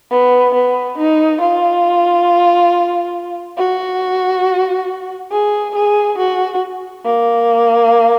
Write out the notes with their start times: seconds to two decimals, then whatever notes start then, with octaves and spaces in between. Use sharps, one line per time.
0.11 B3
0.54 B3
0.98 D#4
1.41 F4
3.58 F#4
5.32 G#4
5.75 G#4
6.18 F#4
7.05 A#3